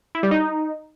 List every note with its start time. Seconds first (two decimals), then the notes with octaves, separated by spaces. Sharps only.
0.15 E4
0.23 G3
0.31 D#4